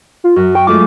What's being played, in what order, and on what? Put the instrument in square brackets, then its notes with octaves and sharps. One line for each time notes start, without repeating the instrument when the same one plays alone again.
[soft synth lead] F4
[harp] F#2 [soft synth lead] F#4
[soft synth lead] G5 [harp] C#6
[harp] G#3 A3 F4 [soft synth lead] D6